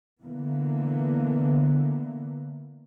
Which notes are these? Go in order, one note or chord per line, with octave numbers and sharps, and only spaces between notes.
D3 E3 A#3 B3